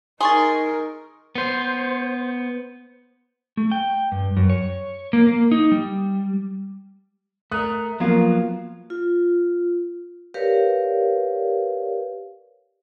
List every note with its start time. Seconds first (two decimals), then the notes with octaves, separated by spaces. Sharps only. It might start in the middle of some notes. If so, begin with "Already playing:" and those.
0.21 D#4 G#4 A#4 C6 C#6 A6
1.35 B3 C5
3.57 A3
3.72 G5
4.12 G2
4.37 F#2
4.50 C#5
5.13 A#3
5.27 A#3
5.51 D#4
5.72 G3
7.52 A3 A#4 D#6 F#6
8.00 F3 F#3 A#3 B3 F4 A#4
8.90 F4
10.34 G4 A#4 B4 C#5 D5 F5